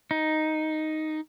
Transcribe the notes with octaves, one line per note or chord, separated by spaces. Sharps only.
D#4